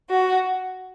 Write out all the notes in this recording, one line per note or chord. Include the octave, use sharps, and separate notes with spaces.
F#4